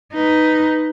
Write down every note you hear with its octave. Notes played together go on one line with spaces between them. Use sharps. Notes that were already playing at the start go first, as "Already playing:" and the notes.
D#4 B4